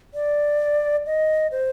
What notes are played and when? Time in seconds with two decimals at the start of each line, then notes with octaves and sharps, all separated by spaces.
0.14 D5
1.06 D#5
1.52 C5